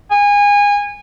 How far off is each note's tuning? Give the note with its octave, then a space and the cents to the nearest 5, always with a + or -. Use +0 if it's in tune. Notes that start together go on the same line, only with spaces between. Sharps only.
G#5 -25